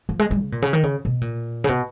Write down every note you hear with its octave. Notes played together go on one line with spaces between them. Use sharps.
F3
G#3
G#3
C#3
A#2
C#3
D#3
C#3
B2
A#2
C#3
B2